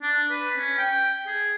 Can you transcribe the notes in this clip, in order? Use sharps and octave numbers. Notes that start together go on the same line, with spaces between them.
D4
B4
C#4
G5
G#4